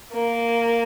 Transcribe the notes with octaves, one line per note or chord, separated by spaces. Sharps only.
A#3